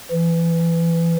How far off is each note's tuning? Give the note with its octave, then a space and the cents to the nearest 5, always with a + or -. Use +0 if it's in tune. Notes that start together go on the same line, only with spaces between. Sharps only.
E3 +25